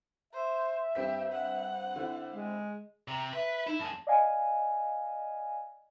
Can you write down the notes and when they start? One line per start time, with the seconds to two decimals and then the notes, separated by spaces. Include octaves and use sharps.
0.33 C5 E5
0.95 G2 C4 G4 B6
1.32 F#5
1.96 D3 C4 E4
2.33 G#3
3.08 C3 A#5
3.33 B4 E5
3.67 D#4 E4
3.79 F#2 G#4 A5
4.07 D5 D#5 F5 G#5